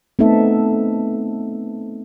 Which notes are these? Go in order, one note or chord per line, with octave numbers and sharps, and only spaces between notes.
A3 B3 C4 D#4 A4 E5